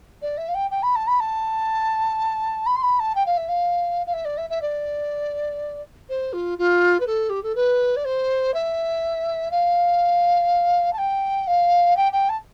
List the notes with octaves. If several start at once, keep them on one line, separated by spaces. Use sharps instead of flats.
D5
E5
F5
G5
G5
B5
A5
B5
A5
B5
C6
B5
A5
G5
F5
E5
F5
F5
E5
D5
E5
E5
D5
C5
F4
F4
B4
A4
G4
A4
B4
D5
C5
E5
F5
A5
G5
F5
G5
G5
A5